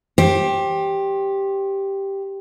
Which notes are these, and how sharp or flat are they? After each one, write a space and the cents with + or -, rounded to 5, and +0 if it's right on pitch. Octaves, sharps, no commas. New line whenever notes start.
G4 +0 C5 +30